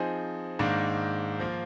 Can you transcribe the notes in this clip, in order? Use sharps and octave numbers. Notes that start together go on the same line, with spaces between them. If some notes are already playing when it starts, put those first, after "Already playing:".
Already playing: F3 C4 D#4 G#4
G#2 D#3 A#3 D4
F3 A#3 F4